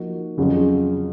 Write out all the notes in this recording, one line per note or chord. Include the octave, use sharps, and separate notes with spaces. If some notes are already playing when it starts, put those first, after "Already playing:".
Already playing: F3 A#3 D#4 F#4
F2 C#3 F#3 C#4 F4